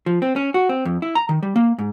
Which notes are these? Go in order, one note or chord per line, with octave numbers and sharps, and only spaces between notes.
F3
C4
C#4
F#4
C4
F2
E4
A#5
D#3
G3
A#3
G#2